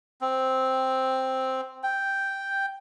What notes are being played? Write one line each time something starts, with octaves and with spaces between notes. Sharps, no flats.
C4
G5